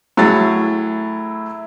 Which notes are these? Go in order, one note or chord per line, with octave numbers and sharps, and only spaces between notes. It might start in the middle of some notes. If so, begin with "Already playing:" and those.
A2 F#3 A3 E4 G#4 A6